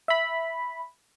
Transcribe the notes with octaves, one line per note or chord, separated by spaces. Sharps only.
E5 B5